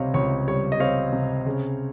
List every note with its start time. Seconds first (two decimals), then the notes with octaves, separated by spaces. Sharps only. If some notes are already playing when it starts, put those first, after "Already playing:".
Already playing: C#2 C3 G3 C4 C#5 D#5 F5
0.14 C#2 C#5
0.48 G3 C#5
0.72 D#5
0.80 C4 C#5 F5
1.13 C3
1.46 C#3